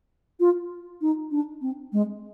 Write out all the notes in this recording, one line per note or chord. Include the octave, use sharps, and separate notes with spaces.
F4
D#4
D4
C4
G#3